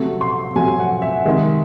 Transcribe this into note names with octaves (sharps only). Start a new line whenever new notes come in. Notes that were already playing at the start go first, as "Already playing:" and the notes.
Already playing: C3 F#3 A3
C6
C3 F#3 A3 G#5
F#5
E5
C3 D#3 G#3